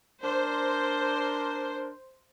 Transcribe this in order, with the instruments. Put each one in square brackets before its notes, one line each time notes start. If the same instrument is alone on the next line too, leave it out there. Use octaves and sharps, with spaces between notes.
[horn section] D4 A#4 [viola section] C5